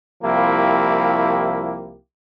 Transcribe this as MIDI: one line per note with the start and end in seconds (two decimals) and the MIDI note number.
0.23 1.97 36
0.23 1.97 53
0.23 1.97 58
0.23 1.97 64
0.23 1.97 67